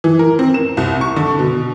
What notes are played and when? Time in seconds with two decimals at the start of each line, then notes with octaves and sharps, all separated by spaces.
0.04 E3
0.19 A#4
0.39 C4
0.54 E7
0.77 C2
1.01 C#6
1.16 D3
1.39 B2